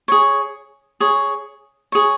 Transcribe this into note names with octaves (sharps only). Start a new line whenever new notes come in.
G#4 C#5
G#4 C#5
G#4 C#5